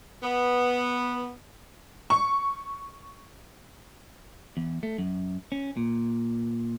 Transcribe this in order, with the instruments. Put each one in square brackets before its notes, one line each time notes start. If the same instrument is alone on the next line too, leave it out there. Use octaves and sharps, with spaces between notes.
[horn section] B3
[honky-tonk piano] C#6
[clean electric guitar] E2
A3
F#2
C#4
A#2